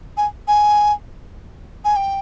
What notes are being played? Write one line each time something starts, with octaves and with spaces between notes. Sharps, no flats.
G#5
G#5
G#5
G5